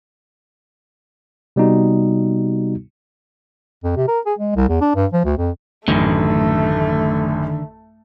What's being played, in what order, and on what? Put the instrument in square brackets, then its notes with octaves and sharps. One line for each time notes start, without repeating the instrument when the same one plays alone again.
[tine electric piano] C3 G3 B3 D#4 F#4
[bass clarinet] F2
C3
A#4
G#4
G#3
C2
E2
D4
G2
F3
D2
F2
[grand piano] A1 F#2 [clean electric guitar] D3 D#3 [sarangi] A3